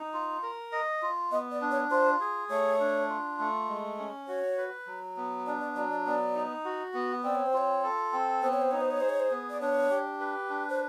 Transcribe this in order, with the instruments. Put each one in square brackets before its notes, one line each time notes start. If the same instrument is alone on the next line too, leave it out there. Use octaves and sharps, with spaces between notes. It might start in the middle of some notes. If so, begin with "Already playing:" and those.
Already playing: [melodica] D#4
F4
A#4
D#5
F4
[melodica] B3 [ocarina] D#5
[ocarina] D5
[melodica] D4
[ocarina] C#5
[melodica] F4 [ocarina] C5
[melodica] G#4
[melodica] A3 [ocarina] C#5
[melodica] D4
F4
A3
G#3
C#4
[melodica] F#4 [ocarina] C#5
[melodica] B4
F#3
B3
[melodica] D4 [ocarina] D5
[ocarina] D5
[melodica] F#3 [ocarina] D5
[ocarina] D5
[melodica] B3 [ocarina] D5
[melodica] D#4
F#4
B3
[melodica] C4 [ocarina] D5
[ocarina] C#5
C5
[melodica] F4 [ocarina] C#5
[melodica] A4
C4
[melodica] B3 [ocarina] C5
[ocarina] C#5
C5
[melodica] D#4 [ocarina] C#5
[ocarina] C5
C#5
[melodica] G#4 [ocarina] C5
[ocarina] C#5
C5
[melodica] B3
[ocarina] D5
[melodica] D4 [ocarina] C#5
[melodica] G4
B4
D4
[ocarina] C5